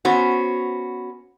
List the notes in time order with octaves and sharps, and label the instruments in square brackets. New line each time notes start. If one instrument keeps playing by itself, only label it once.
[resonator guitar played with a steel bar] B3 C#4 F#4 C5